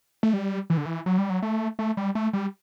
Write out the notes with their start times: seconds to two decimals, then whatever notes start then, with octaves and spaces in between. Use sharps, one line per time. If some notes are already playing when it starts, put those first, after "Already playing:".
0.23 A3
0.33 G3
0.70 E3
0.77 D3
0.86 E3
1.06 F#3
1.18 G3
1.30 F#3
1.42 A3
1.79 A3
1.97 G3
2.15 A3
2.33 G3